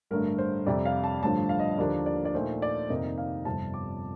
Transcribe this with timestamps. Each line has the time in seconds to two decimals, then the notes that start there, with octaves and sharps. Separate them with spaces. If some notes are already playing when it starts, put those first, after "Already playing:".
0.11 A1 G2 D3 A3 A#4
0.38 C5
0.66 F2 C3 G3 D5
0.85 F5
1.04 A5
1.22 A1 G2 D3 F3 A5
1.49 F5
1.59 D#5
1.78 D#2 D3 F3 A#3 D4 D5
2.06 D5
2.25 D5
2.34 A#2 A3 D#4 C5
2.62 D5
2.89 F2 C3 D#3 A#3 D#4 D#5
3.18 F5
3.45 G1 F2 C3 F3 A5
3.74 D6